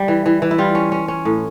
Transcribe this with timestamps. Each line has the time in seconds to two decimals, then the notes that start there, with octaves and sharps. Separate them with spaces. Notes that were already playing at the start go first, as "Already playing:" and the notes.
Already playing: G3
0.08 E3
0.26 E3
0.42 E3
0.51 E4
0.58 G3 F4
0.75 C#4
0.92 C#4
1.08 C#4
1.25 A2